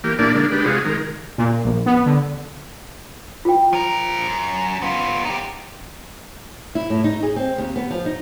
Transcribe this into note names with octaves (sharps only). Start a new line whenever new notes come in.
E3 A#3 G4
A#2 A#3 D4 E4 D5 A5
D3 G#3 A#3 D4
G#3 D4 G4 B4
C3 G#3 F4 F#4 G#4
D#3 G#3 A#4
A#2
A#1
B3
D3
F4 G5
F3 A#4
F#2
B3 F4
D#4 G4
E4
A2
D#4
G#4
C4
D#2
B3
F3
D#4